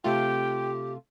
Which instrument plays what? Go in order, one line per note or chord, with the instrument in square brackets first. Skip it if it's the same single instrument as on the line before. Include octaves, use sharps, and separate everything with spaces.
[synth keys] C3 A3 F4 [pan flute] G4 [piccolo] G5